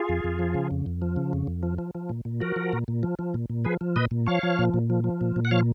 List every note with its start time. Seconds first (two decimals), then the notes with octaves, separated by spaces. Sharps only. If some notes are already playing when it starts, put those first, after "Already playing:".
Already playing: F4 G#4
0.09 F2
0.24 F2
0.39 F3
0.54 C#3
0.71 F2
0.86 F2
1.02 F3
1.16 C#3
1.33 F2
1.47 F2
1.63 F3
1.78 F3
1.95 F3
2.09 A#2
2.25 A#2
2.40 F3 F#4 A#4
2.56 F3
2.73 A#2
2.88 A#2
3.03 F3
3.19 F3
3.34 A#2
3.50 A#2
3.65 F3 G#4 B4
3.81 F3
3.96 A#2 B4 D#5
4.11 A#2
4.27 F3 C#5 F5
4.43 F3
4.59 A#2
4.74 A#2
4.90 F3
5.04 F3
5.21 A#2
5.36 A#2
5.45 F#5
5.51 F3 C#5 F5